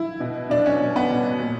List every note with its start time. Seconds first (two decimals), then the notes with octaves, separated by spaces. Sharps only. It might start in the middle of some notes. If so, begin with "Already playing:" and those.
Already playing: E4
0.20 B2
0.50 B2 D4
0.66 C#4
0.80 B2
0.96 B3
1.11 B2
1.40 A#2